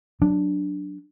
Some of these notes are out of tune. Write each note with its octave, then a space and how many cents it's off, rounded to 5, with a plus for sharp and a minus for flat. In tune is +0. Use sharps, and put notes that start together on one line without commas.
F#3 +0 D4 +0